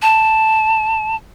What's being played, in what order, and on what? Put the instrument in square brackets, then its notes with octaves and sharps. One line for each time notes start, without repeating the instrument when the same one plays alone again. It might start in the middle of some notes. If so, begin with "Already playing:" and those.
[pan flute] A5